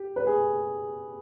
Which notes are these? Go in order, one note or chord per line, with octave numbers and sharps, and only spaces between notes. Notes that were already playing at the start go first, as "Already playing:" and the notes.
Already playing: G4
B4
G#4